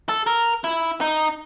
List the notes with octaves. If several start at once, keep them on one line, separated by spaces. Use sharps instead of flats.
A4
A#4
E4
D#4